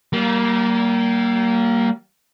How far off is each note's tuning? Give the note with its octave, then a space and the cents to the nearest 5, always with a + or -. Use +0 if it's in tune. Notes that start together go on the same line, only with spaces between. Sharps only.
G3 -35 A#3 +0